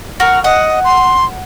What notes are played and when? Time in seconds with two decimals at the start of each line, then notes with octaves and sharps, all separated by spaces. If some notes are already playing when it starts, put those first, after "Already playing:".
0.20 F#4 A#4 F6
0.44 D#5 F#5
0.84 C6